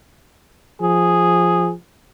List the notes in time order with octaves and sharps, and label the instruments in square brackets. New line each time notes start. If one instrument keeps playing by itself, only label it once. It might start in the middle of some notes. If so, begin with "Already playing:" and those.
[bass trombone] F3 [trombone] G#4